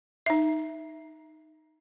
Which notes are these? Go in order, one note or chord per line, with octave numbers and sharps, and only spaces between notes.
D#4 E5